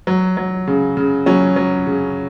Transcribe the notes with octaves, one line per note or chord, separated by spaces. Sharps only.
F#3
F#3
C#3
C#3
F#3 C#4
F#3
C#3